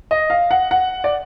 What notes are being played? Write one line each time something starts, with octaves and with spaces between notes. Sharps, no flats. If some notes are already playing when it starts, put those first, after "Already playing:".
D#5
F5
F#5
F#5
D5